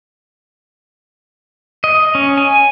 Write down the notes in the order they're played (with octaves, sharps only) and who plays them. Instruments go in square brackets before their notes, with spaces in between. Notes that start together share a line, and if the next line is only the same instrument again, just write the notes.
[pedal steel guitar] D#5
C#4
G#5